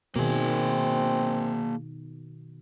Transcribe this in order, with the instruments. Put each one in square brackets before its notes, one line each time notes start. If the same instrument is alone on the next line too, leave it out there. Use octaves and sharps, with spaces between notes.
[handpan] B2 D#3 [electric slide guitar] A#3 G#4 [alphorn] C4